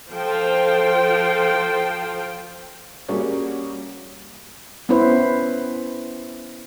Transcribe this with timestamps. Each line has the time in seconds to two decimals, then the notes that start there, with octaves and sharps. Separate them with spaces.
0.11 F3 F4 A4 C5 G5
3.08 G3 A#3 C#4 F#4 G#4
4.89 B3 C#4 E4 B4 C5